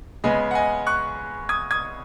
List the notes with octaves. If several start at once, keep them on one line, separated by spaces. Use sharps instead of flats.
C#3 G#3 B3 D#5 G#5
F#5
D#5 G#5
C#6 F#6
D#6 G#6
D#6 G#6